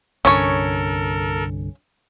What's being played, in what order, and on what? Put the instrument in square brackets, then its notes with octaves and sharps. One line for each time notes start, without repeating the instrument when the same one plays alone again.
[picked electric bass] C2 G2 D3 [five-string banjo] C#4 C#5 [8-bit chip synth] A4 A#4